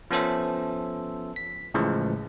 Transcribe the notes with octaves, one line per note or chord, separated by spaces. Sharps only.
F3 B3 C#4 A4 C5 E5
B6
A2 C#3 E3 F3 G#3